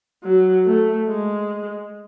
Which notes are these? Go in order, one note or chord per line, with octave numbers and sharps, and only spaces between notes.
F#3
A3
G#3